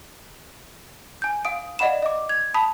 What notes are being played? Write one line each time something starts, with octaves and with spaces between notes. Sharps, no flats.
G#5 G6
F5 D#6 D7
D5 D#5 F5 F#5 B5 E7
D#5 D6
G#6 F7
A5 B5 D#6 B6